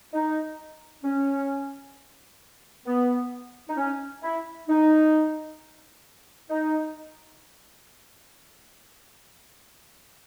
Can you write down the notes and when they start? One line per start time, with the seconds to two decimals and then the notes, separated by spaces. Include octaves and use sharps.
0.13 D#4
1.04 C#4
2.86 B3
3.69 D#4
3.77 C#4
4.22 E4
4.68 D#4
6.50 D#4